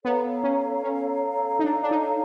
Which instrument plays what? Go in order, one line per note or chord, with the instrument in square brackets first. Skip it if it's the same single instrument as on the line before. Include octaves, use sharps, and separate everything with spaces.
[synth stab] B3 [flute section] A4 C#5 F5 A#5
[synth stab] C#4
C#4
D#4
D4
D4
D#4